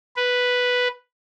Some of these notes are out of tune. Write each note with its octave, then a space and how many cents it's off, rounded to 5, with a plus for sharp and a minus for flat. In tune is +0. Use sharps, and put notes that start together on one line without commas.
B4 +0